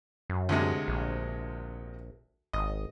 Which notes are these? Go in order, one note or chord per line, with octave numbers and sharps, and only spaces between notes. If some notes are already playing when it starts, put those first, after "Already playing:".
F#2
D2 C3 G#3
A#1
G#1 D#5